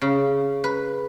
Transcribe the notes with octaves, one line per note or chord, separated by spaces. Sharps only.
C#3
B4